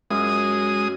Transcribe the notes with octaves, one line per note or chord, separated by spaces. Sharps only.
F#2 G#3 D#6